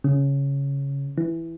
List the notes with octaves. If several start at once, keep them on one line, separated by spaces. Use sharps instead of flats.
C#3
E3